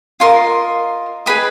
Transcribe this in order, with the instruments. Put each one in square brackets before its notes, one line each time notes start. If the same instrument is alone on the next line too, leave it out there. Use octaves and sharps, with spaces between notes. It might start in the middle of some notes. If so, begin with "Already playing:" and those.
[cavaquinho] F4 A#4 D#5 C6
G#4 B4 D#5 B5